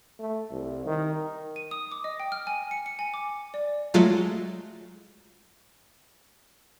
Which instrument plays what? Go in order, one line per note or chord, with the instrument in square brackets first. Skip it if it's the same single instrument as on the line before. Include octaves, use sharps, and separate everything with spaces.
[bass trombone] A3
C2
D#3
[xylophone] D#7
D#6
D6
D#5
G5
F6
G#5
C#7
C#7
G#5
D6
D5
[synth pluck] F#3 G#3 A3 F4